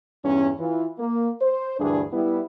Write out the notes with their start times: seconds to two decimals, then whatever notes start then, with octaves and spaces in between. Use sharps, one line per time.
0.24 E2 G2 C#4
0.59 E3 F4
0.99 A#3
1.41 C5
1.80 D2 G2 E3 D4 G#4
2.12 G3 B3 E4